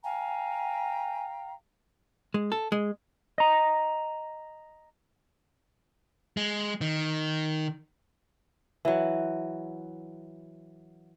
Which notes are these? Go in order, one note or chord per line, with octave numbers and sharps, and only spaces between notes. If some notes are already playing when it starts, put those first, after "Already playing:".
F5 G5 G#5 A#5
G#3
A4
G#3
D#5 A#5
G#3
D#3
E3 F#3